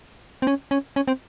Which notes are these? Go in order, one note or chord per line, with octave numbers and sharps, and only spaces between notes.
C4
C#4
C#4
C#4
C4